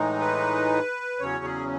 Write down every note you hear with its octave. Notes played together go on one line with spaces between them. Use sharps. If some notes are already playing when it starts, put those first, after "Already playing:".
Already playing: A2 E3 G#3 D#4
B4
E2 C#3 F#3 C#4 C#5
G#4